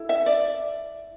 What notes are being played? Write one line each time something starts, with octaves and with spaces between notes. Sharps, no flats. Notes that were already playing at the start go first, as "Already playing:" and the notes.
Already playing: E4 A4
E5
D5